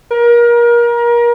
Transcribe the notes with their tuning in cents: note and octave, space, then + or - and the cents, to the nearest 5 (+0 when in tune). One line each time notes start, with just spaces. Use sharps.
A#4 +30